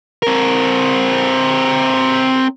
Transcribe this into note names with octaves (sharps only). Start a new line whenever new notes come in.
C4 A#4